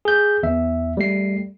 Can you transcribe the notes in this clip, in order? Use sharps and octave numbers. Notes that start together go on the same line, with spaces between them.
G#4 G6
E2 E5
G3 A3 C7